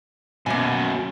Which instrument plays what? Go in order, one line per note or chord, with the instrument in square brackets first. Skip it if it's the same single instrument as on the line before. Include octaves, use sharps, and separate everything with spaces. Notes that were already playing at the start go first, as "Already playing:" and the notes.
[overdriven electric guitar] F#2 B2 [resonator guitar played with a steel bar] A#3 G#5